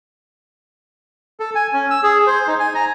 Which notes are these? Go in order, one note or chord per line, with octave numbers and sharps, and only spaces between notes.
A4
G#5
C#4
E6
G#4
C5
D#4
G#5
A#5